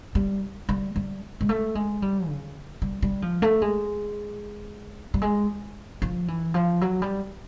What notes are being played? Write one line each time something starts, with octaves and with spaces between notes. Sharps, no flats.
G3
G3
G3
G#3
A3
G#3
G3
C#3
G3
G3
F3
A3
G#3
G3
G#3
F3
E3
F3
F#3
G3